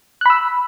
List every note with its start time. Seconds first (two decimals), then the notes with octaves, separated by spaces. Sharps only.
0.21 F#6
0.26 B5
0.30 E6